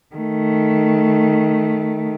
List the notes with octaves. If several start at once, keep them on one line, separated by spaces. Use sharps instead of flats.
D#3 A3